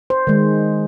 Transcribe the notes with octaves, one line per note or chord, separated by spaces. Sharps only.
C5
D#3 G#3